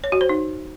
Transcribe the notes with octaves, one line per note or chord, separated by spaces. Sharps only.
C#5
F#4
C5
D#4